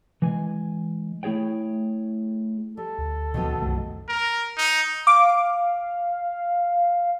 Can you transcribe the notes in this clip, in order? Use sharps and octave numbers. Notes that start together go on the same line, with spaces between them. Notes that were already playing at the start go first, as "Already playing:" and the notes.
E3 G#3 G#5
A3 E4 G#4 C#5 G5
G3 A4
D2
C#2 A#2 D#3 F#3 B3
C2 F#2 A3
A#4
D#4
F5 D6